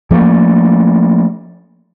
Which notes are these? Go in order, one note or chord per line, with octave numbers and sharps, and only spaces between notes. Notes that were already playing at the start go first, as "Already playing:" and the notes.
F3 G3 A3 A#3